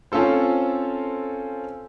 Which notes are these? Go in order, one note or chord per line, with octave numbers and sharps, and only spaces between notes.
C4 C#4 F4 A4 C5